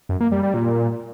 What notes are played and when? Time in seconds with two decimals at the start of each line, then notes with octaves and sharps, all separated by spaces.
0.09 F#2
0.20 A#3
0.32 G3
0.43 G3
0.54 A#2